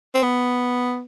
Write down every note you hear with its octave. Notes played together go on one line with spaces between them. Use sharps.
C4
B3